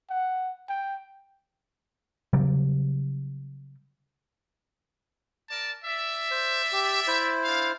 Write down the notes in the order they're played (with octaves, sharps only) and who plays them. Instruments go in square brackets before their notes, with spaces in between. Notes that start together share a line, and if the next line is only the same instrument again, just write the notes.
[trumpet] F#5
G5
[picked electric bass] C#3 F#3 G3
[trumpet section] A#4 D5 A5
D5 E5
[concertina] C5
G4
E4 C5
[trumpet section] D4 F5